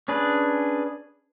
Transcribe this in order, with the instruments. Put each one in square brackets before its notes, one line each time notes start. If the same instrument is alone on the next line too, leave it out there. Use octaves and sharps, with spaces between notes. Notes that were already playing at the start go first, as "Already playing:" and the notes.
[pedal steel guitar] C#4 D4 G#4 B4